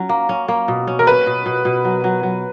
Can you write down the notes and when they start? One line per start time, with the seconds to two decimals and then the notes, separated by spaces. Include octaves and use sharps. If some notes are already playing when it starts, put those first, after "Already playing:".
Already playing: F#3 C#4
0.09 A#3
0.29 C#4
0.48 A#3
0.68 B2
0.87 C#4
0.99 A#4
1.07 C#4 B4
1.27 B2
1.46 B2
1.65 B2
1.85 F#3
2.04 F#3
2.23 F#3